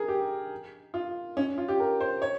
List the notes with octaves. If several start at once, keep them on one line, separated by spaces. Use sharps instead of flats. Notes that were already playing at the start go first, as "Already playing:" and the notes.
Already playing: G#4 A#4
G4
F4
C#4
F4
G4
A#4
C5
C#5